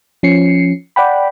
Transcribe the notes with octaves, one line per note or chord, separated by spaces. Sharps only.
F3 C#4 C7 C#7
D5 F#5 G5 B5